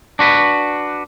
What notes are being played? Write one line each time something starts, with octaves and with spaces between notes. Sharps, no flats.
D4 F#4 B4